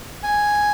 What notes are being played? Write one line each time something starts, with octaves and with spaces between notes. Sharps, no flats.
G#5